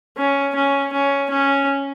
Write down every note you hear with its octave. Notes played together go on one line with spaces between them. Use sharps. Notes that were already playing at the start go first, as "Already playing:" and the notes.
C#4
C#4
C#4
C#4